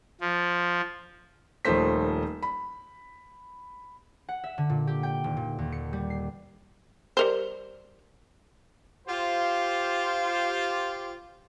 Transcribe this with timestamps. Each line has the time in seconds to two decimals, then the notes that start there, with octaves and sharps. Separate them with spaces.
0.21 F3
1.65 D#1 D#3 F3 A3 C5 B6
2.43 B5
4.29 F#5
4.44 E5
4.58 D3
4.70 A#2
4.87 G4
5.03 G5
5.24 D#1
5.37 A#2
5.59 D#2
5.72 C#7
5.93 G3
6.10 C7
7.17 G3 A#4 C5
9.08 F4 G4 C5